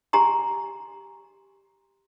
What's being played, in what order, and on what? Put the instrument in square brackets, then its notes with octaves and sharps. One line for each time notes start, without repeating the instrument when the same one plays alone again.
[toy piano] G4 G#5 A#5 C6